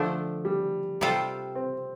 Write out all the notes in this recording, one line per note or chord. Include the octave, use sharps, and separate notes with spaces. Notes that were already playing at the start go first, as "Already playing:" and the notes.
Already playing: D3 F3 A3 D4
G3
C3 G3 F4 A4 C5
C4